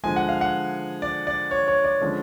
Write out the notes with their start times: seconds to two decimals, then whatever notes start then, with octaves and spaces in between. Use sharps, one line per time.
0.04 D3 F3 G#3 G#5
0.16 F#5
0.29 F5
0.41 F#5
1.02 D5
1.27 D5
1.51 C#5
1.68 C#5
1.84 D5
2.01 D3 F3 G#3 C#4